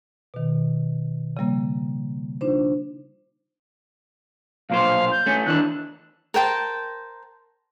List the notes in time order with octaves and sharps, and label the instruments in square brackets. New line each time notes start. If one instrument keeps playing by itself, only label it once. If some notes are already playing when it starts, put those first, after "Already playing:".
[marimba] B2 D#3
C#3 F3 G3 A#3
D4 D#4 F4 C5
[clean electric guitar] B1 A#2 C5 [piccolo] F5
[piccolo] G6
[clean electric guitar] A3 C#4
[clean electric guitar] D#2 E3 D4 [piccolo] F#6
[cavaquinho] A#4 C5 G5 A5